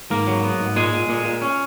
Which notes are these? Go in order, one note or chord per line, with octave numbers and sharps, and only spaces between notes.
G#2 A#3 A#4
F#3
B3
G#2
A#2 G#3 G#4
A#2
A#2
A#2
C#4